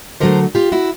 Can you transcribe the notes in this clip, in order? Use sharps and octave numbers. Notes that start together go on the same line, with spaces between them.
D3 F#3 A3 A#4 C5
F4 G4
E4 F#4